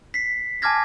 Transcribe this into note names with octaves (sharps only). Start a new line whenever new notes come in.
B6 C7
G#5 A5 D6 F6 G#6 A#6